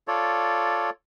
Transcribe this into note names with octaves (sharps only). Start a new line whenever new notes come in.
F4 A4 C#5 D5